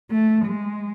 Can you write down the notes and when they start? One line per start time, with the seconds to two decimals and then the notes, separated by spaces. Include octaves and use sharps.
0.11 A3
0.45 G#3